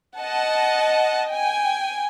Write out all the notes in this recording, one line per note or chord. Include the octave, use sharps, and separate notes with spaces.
D#5 F#5 A5
G5 G#5